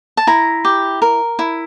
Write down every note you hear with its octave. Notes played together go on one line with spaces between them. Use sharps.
A5
E4 A#5
G4
A#4
E4